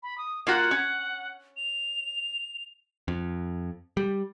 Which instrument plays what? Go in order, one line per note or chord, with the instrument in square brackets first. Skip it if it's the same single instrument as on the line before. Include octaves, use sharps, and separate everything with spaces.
[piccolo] B5
D#6
[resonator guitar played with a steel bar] A#3 F4 F#4 [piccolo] F#5
[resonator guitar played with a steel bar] C#4
[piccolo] F7
[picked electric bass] F2
G3